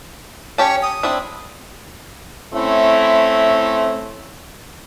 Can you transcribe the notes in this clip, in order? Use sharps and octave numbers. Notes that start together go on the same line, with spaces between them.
C#4 G4 C#5 A5
D#6
C4 D4 E4
A3 C4 C#4 E4